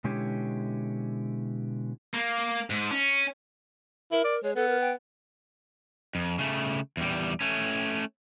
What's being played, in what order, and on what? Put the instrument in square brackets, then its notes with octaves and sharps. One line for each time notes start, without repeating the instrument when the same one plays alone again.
[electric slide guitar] B2 D3 G#3 C#4 E4 G4
[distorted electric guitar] A#3
G#2
C#4
[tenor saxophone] E4 [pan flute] A#4
[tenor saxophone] D5
[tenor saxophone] G#3 [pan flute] C#5
[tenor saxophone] B3 [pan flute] A4
[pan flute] A#4
G5
[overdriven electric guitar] F2
C#3 A3
E2 G3
A3 C#4